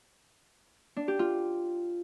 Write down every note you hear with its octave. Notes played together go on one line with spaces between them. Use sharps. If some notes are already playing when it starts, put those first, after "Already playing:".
D4
G4
F4